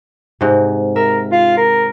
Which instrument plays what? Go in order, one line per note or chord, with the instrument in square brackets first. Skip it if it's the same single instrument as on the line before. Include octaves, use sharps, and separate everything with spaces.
[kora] G#2 C3
[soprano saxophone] A#4 [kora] E5
[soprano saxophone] F4
A#4